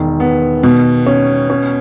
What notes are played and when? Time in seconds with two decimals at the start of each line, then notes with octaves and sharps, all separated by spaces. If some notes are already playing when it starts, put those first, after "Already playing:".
Already playing: E1 D#3
0.20 B3
0.63 B2
1.06 C#4
1.50 C#4